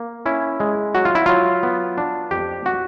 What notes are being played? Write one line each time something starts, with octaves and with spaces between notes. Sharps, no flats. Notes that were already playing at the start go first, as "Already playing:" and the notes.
Already playing: A#3
C#4 E4
G#3
F#3 F#4
F4
E4
F#3 F4
B3
D4
F2 G4
F#4